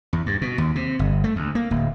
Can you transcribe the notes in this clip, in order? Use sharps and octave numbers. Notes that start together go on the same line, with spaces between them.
E2
G2
B2
D#2
C3
G1
A3
D2
A#3
D1